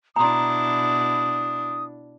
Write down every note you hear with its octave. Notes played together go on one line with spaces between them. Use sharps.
B2 D4 E4 A#5 C6 D#6